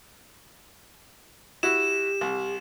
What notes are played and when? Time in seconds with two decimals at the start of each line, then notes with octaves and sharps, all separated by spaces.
1.63 E4 F#4 G4 E7
2.21 C2